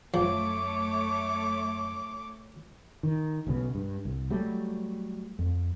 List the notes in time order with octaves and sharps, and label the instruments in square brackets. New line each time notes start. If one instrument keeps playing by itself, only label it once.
[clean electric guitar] F#2 [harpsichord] F3 [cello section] A3 C#5 [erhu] D6
[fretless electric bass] D#3
B1 C#3 F3 B3
G2
C2
F#3 G3 A3
F2